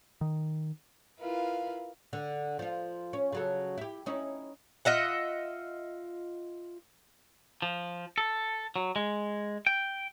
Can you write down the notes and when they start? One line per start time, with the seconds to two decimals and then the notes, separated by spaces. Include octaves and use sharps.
0.21 D#3
1.20 E4 F4 A#4 B4 F5
2.13 D3
2.59 F3 F4
3.13 C#4
3.32 C#3 F#3 A4
3.78 E4 G4
4.06 C#4 D#4 E4
4.85 F4 D#5 E5 F#5
7.62 F3
8.18 A4
8.76 F#3
8.96 G#3
9.67 G5